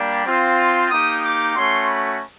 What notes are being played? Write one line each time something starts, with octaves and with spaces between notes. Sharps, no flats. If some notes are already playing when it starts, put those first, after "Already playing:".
Already playing: G3 A#3 D4 G4
C4 F4
A#3 D#4 G4 D#6
D6
A3 C#4 F#4 C6
B5